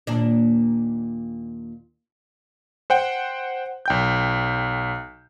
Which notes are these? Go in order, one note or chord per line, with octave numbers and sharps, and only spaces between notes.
D#2 A#2 D4
C5 F#5 G5
B1 G5 G6